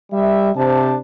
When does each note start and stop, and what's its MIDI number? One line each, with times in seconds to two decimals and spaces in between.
0.12 0.50 55
0.12 0.50 76
0.56 0.96 48
0.56 0.96 62
0.56 0.96 72
0.56 0.96 81